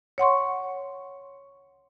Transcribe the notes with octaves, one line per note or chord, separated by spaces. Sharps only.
C#5 F#5 C6 C#6